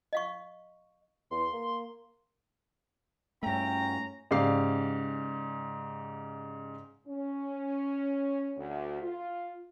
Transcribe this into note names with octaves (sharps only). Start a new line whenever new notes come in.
D#5 F5 C#6
E2 C6
A#3
G2 A3 C#4 G5 A#5
G#2 C#3 G4 D5 F5 C7
C#4
D2
F4